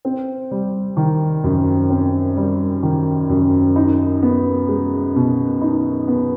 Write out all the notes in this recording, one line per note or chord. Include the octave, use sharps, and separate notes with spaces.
C4
G3
D#3
F#2
C4
G3
D#3
F#2
D#4
B3
G#3
B2
D#4
B3